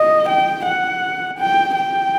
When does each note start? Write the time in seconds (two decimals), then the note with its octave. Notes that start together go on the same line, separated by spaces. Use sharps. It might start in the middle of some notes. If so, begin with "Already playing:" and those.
Already playing: D#5
0.29 G5
0.65 F#5
1.39 G5
1.75 G5